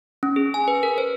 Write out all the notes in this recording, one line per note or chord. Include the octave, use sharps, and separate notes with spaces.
C#4
G#4
G#5
B4
A#4
C5